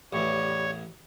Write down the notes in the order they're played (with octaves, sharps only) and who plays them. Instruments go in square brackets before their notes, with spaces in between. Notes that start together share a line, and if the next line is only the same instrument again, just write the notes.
[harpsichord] A1 E2 [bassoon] G3 [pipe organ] C#5